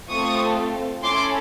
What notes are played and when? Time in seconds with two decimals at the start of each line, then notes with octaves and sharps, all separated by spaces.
0.10 A3 C4 F4 A4 C#6 D#6
1.04 C#4 E4 A4 C6 D6